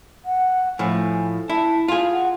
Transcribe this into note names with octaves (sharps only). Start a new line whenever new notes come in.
F#5
A2 F3 G#5
E4 A5
F4 G#4 F5
F#5